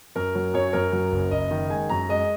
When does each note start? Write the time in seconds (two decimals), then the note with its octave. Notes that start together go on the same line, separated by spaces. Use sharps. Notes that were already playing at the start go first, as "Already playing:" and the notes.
0.15 F#2 A#4
0.35 F#3
0.54 F#2 C#5
0.73 F#2 A#4
0.92 F#3
1.12 F#1
1.31 F#1 D#5
1.51 D#3
1.70 G#3 G#5
1.89 F#2 A#5
2.09 G#3 D#5